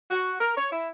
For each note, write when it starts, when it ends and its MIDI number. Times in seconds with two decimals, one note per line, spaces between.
0.11 0.34 66
0.41 0.54 70
0.57 0.68 73
0.72 0.89 64